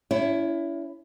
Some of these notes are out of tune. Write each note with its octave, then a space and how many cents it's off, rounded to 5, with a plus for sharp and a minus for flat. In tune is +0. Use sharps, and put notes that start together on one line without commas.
C#4 +40 E4 +15 C#5 -10